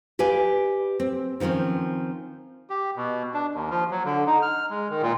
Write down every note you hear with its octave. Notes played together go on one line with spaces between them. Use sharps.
G4 B4 D5 F5 G#5
C4
D#3 F3 G3 C4 C#4
G4
B2
D4
D#2
F3
F#3
D3
D#4
F6
G#3
D#3
A#2